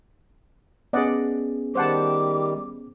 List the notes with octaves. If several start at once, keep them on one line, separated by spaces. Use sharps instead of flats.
B3 C#4 G#4 D5 D#5 F#5
D#3 G3 C5 F#5 A5 D6